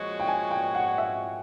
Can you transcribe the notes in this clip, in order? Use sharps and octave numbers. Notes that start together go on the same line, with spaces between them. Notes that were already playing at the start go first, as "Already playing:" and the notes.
Already playing: A#2 F3 G#3 C#4 F#4
G5
G#5
G5
F#5
E5